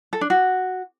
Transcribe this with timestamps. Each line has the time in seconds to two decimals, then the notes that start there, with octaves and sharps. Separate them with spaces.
0.13 A4
0.21 D4
0.30 F#4